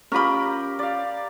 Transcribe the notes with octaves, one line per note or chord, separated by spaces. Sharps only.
C#4 F4 G4 A#4 B5
D5 F5